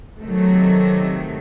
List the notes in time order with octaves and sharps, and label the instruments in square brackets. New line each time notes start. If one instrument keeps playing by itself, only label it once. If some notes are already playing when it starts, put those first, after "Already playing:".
[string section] C3 D#3 F#3 A3